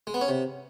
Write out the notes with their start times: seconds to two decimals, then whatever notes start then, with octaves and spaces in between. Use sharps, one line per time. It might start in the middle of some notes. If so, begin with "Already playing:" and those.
0.07 G#3
0.14 B3
0.21 C#4
0.28 C3